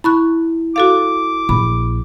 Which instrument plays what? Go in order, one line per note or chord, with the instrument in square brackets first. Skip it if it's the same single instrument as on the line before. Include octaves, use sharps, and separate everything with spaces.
[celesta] E4 [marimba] B5 C#6 F#6
[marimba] F#4 A4 F5 [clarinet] D6
[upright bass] A#1 [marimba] B5